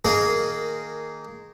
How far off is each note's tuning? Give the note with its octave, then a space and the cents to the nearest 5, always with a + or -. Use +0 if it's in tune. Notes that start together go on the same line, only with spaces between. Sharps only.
D#3 -5 A#3 -15 G#4 +0